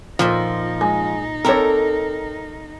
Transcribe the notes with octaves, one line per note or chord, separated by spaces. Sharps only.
A#2 F3 D#4 D#5 E5
G#3
C4 A4 A#4 C#5 D5 E5